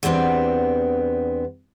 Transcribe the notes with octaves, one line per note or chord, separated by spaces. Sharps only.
E2 G3 B3 C4 D4